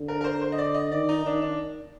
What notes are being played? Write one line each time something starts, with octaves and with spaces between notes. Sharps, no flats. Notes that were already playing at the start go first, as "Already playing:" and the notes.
Already playing: D3
A#4
A#4
C5
C5
D#5
D5
D#5
D#3 D5
D#4
D#3 D4
D4